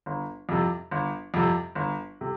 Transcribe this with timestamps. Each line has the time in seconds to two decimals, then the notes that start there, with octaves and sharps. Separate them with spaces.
0.06 G1
0.49 F2 C3
0.91 G1
1.34 F2 C3
1.75 G1
2.21 C3